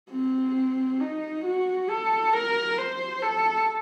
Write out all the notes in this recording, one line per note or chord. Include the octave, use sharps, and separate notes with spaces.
C4
D#4
F#4
A4
A#4
C5
A4